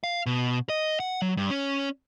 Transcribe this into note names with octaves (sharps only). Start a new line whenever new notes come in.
F5
B2
D#5
F#5
F#3
G2
C#4